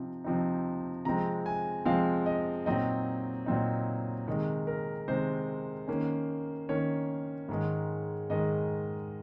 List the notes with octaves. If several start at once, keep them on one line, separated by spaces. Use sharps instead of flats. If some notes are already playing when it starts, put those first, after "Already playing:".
Already playing: C3 F3 C4 D#4
C3 F3 C4 D#4
C3 F3 G#3 C4 A#5
G#5
C3 F3 G#3 C4 F5
D#5
A#2 F#3 C4 D#4 D#5
A#2 F#3 C4 D#4
C3 D#3 G#3
A#4
C3 D#3 G#3 C5
D#3 A#3 C#4
D#3 A#3 C#4 C#5
G#2 D#3 G#3
G#2 D#3 G#3 D#5